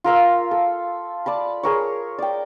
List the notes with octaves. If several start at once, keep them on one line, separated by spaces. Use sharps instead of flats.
F4 A#4 F5 E6
A4
D5 A5 B5
G#4 A#4 C#5
D5 G5